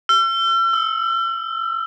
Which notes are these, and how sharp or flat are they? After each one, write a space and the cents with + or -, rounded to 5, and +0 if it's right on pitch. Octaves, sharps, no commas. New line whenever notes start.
E6 +45
E6 -15